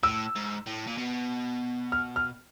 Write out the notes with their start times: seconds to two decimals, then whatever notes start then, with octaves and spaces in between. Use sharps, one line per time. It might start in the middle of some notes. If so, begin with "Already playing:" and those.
0.03 A2 E6
0.35 G#2
0.66 A2
0.87 A#2
0.97 B2
1.92 F6
2.16 F6